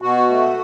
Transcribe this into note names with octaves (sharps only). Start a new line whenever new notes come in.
B2 F#4
A3